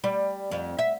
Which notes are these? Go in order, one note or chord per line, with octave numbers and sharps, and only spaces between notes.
G3
F2
E5